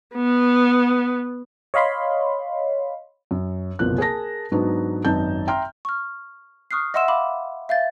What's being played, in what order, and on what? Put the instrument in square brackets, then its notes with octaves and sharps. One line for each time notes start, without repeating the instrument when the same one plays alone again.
[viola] B3
[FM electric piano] C#5 D#5 F5 B5 C6
[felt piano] F#2
F#1 C2 B2 F3 A#3 F#6
G#4 A#4 A5 A#6
G#2 F#3 B3 D4 D#4
G#1 F#2 D#4 B4 A5 G6
E5 G5 A#5 C6 F6
[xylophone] C#6 F6
C#6 D#6 F6 F#6 C7
D#5 E5 F#5 C6 E6 E7
F5 B5 D6
E5 F5 G6 A6